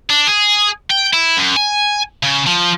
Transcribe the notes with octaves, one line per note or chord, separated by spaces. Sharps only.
D4
G#4
G5
E4
F#2
G#5
C#3
F3